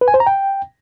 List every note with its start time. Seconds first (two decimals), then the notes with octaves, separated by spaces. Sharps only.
0.01 B4
0.08 G#5
0.14 C5
0.20 A#5
0.27 G5